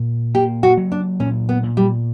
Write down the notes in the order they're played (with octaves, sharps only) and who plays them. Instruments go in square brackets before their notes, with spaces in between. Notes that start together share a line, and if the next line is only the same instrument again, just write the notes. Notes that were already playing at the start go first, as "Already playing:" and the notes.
Already playing: [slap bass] A#2
[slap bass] A#3 [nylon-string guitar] G4
[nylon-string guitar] F#4
[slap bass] F#3
[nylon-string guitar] D4
[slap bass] A#2 [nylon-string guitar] C#4
[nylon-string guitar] B3
[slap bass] A#2
[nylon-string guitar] G3